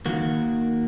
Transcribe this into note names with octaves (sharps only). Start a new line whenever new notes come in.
D#2 D#3 A#3 F#4